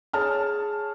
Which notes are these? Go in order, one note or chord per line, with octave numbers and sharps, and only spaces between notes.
G#4 C#5 A5 F6